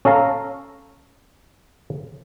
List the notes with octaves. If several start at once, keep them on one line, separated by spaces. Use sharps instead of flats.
C#4 A4 F5 A#5